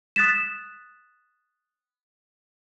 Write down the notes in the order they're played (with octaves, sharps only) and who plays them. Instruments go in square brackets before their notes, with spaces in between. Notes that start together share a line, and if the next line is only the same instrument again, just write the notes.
[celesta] D#6 F#6 A6 B6 E7